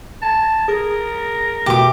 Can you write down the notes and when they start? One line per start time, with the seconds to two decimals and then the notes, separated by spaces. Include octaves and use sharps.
0.22 A5
0.68 G#4 A#4
1.66 E2 B2 A3 G4 D6